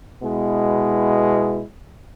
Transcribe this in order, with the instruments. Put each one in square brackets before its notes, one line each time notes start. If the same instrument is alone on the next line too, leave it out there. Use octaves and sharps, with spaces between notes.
[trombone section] B2 G#3 B3 E4